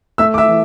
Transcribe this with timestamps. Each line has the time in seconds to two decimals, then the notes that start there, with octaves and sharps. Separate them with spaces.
0.18 A3 E5 E6
0.34 D6
0.38 E5 E6
0.48 E3